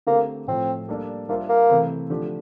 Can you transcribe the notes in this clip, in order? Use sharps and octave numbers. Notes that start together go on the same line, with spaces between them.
D3 A3 A#3 C4 G4
A2 F3 A3 C4
G3 A#3 D4 A4 D5
G3 A#3 D4 F4 C5 E5
A#3
C3 E3 A3 C4
D3 F3 A3 D4 G4